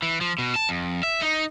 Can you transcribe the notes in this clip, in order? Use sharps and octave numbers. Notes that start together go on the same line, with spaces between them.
E3
F3
B2
A5
F2
E5
D#4